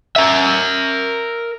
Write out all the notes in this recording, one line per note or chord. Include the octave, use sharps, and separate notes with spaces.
A#4 E5